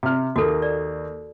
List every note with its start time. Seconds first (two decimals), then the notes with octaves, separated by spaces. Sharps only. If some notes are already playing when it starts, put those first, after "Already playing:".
0.03 C3 F6
0.36 D#2 A#3 F#4 A4
0.62 D5